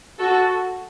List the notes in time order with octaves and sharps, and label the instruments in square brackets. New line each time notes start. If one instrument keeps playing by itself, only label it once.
[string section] F#4 A4